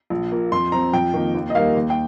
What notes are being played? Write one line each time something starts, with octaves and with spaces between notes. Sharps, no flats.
A#1
A#2 A#3
F2 C6
F3 C4 A#5
F2 G5
D#3 A#3
D#2
D#5
D#3 G3 A#3 F5
D#2
G5